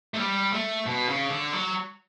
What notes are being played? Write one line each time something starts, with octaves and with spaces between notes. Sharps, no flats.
A3
G3
A3
B2
C#3
D3
F#3